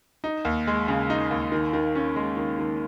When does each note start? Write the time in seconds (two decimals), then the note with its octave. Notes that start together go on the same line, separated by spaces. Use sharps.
0.24 D#4
0.45 D#2
0.67 G#3
0.88 C#3
1.10 D#4
1.31 D#2
1.52 D#3
1.73 D#3
1.95 C#4
2.16 G#3
2.37 D#3
2.59 D#3